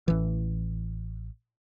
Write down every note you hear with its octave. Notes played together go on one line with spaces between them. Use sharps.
A1 E3